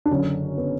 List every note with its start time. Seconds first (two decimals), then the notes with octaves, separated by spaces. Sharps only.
0.06 D4
0.11 F#1 F#2 D3 C#4
0.58 B3